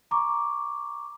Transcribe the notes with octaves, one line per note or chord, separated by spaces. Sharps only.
A#5 C#6 D6